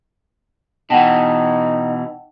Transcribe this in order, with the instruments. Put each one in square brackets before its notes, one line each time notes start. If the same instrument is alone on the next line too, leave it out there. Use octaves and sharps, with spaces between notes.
[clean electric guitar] B2 E3 [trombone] D#4 [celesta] F#5 G5 A5